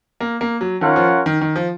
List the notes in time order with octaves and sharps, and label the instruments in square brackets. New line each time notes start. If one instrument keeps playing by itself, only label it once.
[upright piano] A#3
A#3
F#3
[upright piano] D#3 [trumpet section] C#4 F4 A#4 C#5 F#5
[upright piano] F3
D#3
D#3
F3